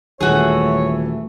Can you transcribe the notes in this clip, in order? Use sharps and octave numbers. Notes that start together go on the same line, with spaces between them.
D#1 E3 A3 F#4 G#4 C#5